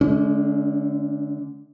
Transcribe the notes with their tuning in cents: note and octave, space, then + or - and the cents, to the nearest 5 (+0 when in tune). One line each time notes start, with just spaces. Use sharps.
D3 +0 G#3 +45 C#4 +35